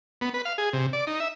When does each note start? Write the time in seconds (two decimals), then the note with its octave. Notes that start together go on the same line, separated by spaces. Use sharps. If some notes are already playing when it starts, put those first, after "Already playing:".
0.21 B3
0.34 B4
0.45 F5
0.58 G#4
0.73 C3
0.93 D5
1.07 D#4
1.20 E5